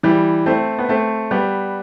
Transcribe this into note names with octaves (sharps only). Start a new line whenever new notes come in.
E3 G3
A3 C4
B3
A3 C4
G3 B3